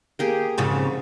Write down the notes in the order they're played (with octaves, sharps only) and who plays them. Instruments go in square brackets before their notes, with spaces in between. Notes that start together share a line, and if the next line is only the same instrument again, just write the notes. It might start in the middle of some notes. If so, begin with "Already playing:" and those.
[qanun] A#3 G4 G#4
[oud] F2 G#2 C#3